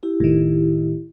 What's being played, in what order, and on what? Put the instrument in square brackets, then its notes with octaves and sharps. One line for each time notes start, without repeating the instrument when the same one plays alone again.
[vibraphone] E4 G4
[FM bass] F1 [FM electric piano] A2 D#3